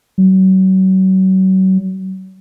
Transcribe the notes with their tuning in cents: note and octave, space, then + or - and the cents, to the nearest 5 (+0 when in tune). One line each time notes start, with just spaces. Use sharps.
F#3 +35